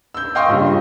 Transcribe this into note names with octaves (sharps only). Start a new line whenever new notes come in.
E6 G6
D#5 F5 G5 C6 C#6 E6
G2 A#2 C#3 G3
D#5